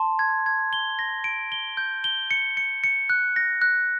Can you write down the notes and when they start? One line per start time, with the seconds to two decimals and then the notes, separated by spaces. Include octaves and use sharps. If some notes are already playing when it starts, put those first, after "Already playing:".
Already playing: A5 C6
0.19 G#6
0.46 G#6
0.73 G7
0.99 A#6
1.24 D7
1.52 G7
1.77 G6
2.04 G7
2.31 C#7
2.57 C#7
2.84 C#7
3.10 F#6
3.36 A#6
3.62 F#6